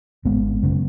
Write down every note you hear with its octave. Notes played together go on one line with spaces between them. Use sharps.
G#1 G#3 B3
F#2 C#3